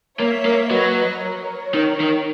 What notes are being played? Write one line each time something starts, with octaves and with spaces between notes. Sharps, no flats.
A#3 C#5 E5
A#3
F#3 B4 D#5
A#4 C#5
D#3
D#3